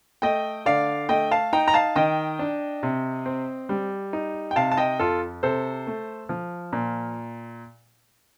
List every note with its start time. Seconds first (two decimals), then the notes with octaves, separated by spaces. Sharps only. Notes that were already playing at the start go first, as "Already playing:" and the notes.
0.22 A3 D#5 G5
0.66 D3 D5 F5
1.09 A3 D#5 G5
1.31 F5 A5
1.53 D#4 G5 A#5
1.68 A#5
1.74 F5 A5
1.96 D#3 D#5 G5
2.39 D4
2.83 C3
3.26 C4
3.69 G3
4.13 D#4
4.51 G5
4.56 C3 F5 A5
4.71 A5
4.77 D#5 G5
5.00 F2 F4 A4
5.43 C3 A4 C5
5.87 A3
6.29 F3
6.73 A#2